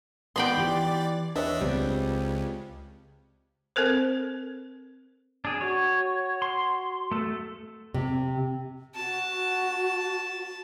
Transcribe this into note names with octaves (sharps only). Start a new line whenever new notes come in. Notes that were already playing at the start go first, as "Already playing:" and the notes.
B3 D#4 F#4 D5 G5 B5 C6
E3 G4
E2 D4 B4 C#5 D#5 E5
C#2 G3 B3 C4
C4 A4 A#4 C5
D4 G#4
F#4 C#5
C6
A3 A4
C3
F#4 A5